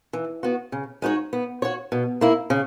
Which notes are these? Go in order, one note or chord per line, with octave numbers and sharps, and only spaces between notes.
E3
B3 F#4
C#3
G#3 D#4 F#4 C#5
B3
F#4 C#5
B2
A#3 E4
C#3